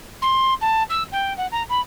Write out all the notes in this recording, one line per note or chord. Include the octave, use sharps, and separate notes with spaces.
C6
A5
E6
G5
F#5
A#5
B5